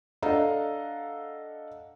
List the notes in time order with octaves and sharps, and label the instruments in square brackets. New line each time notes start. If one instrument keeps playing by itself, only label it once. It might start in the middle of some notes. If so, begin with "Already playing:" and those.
[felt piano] D4 A4 D#5 F5 F#5 A#5